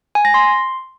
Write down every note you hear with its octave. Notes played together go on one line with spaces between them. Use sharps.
G#5
A#6
C6